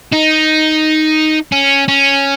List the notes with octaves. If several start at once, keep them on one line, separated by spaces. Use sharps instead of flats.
D#4
C#4
C#4